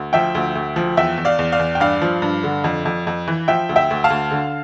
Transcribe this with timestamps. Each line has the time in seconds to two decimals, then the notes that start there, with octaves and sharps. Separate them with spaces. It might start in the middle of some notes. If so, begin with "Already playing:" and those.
Already playing: D2
0.13 F3 E5 G5
0.35 D2
0.55 D2
0.76 F3
0.97 E2 E5 G5
1.18 E2
1.25 D5 F5
1.39 E2
1.52 D5 F5
1.59 E2
1.75 G5
1.80 G2 D5 F5
2.02 F3
2.22 G2
2.44 D3
2.64 F2
2.85 F2
3.07 F2
3.28 E3
3.48 F3 E5 G5
3.69 D2
3.76 E5 G5
3.90 D2
4.04 F5 A5
4.10 D2
4.31 D3